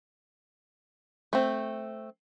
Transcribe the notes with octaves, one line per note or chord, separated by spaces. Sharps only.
A3 C4